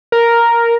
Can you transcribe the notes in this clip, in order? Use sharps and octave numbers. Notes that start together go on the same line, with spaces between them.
A#4